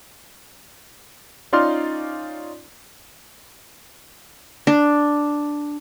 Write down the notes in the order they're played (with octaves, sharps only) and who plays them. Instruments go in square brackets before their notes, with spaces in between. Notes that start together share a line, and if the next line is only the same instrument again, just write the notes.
[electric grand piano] C#4 D#4 F4 D5 C6 F6
[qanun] D4